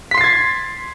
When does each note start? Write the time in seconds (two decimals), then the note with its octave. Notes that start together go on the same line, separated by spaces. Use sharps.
0.11 B6
0.14 C6
0.18 C7
0.21 A6
0.24 G#6